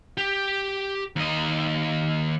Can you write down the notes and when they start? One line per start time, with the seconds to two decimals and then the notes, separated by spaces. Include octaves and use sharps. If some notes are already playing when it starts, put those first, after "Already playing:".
0.17 G4
1.16 D#2 D#5